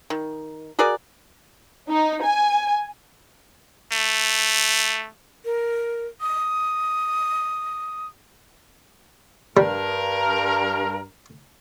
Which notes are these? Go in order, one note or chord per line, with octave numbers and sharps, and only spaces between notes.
D#3
F#4 G#4 A#4 D5
D#4
G#5
A3
A#4
D#6
G2 G3 A#4